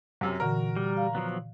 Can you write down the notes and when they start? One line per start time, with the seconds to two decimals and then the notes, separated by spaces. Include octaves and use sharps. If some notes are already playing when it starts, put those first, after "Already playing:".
0.21 F#2 C3
0.40 A#2 D3 E3 F#4 A#4
0.77 G3
0.97 D5 F5
1.15 F3 F#3 B3